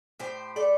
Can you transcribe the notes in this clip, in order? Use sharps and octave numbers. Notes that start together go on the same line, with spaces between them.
A2 G4 C5
A3 A4 D5